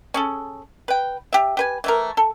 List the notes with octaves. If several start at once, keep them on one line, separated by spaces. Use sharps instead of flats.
C#4 G#4 A4
B4 G5
G4 E5
G4 B4 G#5
E3 A3 A#4
A4